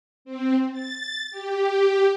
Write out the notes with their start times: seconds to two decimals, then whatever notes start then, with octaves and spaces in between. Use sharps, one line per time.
0.25 C4
0.72 A6
1.31 G4